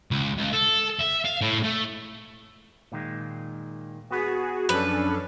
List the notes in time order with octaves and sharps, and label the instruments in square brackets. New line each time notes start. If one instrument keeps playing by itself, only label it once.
[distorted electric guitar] C#2
C#2
A4
E5
F5
A2
A3
[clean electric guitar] A#2 D#3 G#3
[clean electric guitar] B3 B4 [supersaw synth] F#4 G#4
[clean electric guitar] F#2 F3 [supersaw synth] C#4 D4 A4 [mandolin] B4